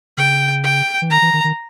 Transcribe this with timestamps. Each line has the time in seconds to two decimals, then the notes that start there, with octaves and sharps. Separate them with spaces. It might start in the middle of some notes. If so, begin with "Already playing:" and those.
0.17 C#3 G5
0.64 G5
1.02 E3
1.10 D#3 A#5
1.22 E3
1.33 D#3
1.44 D#3